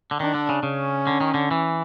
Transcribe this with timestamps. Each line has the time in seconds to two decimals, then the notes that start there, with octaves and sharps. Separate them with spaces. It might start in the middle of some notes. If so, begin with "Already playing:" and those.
0.11 D3
0.20 D#3 D4
0.34 D3
0.49 C#3
0.63 C#3 C#4
1.07 D3
1.21 D#3
1.34 D3
1.51 E3